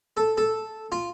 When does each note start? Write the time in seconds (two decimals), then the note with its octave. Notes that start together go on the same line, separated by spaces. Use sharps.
0.17 A4
0.38 A4
0.92 F4